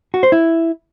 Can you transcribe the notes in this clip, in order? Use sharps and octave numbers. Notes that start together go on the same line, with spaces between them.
F#4
C5
E4